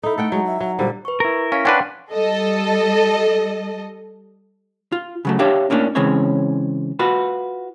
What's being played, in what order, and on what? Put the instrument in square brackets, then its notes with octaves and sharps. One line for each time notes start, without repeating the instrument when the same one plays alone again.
[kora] D#4 E4 [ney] A4
[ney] A3 [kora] A4 F#5 G5
[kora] F#3 [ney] G#3
[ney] E5
[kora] F#3
[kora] A#2 D3 G3 [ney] C5
[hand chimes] B4 C#6
[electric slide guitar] E4 A#4
[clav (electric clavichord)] C#4 [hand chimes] F5 B6
[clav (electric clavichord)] C#4 D4 B4 [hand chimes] F#5 G5 C6
[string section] G3 A4 D#5
[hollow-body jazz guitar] F4
C#3 F#3 A3
D4 G4 C#5 E5 F5
A2 A#3 C#4 D4
C#3 E3 G#3 C4 C#4 C#5
F4 F#4 B4